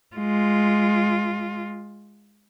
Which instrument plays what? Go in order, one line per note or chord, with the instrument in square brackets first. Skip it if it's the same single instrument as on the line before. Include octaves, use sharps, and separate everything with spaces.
[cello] G#3 F4